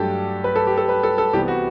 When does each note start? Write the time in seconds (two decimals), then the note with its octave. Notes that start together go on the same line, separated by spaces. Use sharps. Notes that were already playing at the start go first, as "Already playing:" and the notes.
Already playing: G2 F#3 A3 D4 G4 A4
0.44 B4
0.56 A4
0.67 G4
0.78 A4
0.89 B4
1.03 A4
1.18 A4
1.33 C2 C3 E3 G3 B3 G4
1.48 F#4